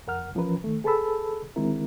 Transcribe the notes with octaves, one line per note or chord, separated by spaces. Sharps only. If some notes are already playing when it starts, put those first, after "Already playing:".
F2 A#4 F#5 F6
E3 F3 C#4 A#4 B4
D#3 A3
G#4 A4 B4 A5 B5 E6
D3 D#3 G#3 C4 E4 A#4